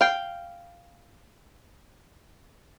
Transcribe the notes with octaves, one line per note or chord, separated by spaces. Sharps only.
F5 G5